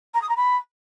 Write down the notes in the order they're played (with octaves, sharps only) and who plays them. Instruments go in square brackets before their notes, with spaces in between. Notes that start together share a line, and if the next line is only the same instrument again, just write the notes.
[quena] A#5
D#6
A#5
B5